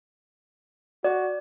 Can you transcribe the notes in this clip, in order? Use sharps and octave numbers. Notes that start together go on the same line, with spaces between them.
F#4 D5